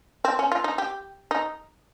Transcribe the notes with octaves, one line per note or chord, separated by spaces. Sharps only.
C4
C#4
F4
D#4
G4
D#4